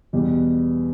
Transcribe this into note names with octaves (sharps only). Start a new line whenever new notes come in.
E2 B2 G3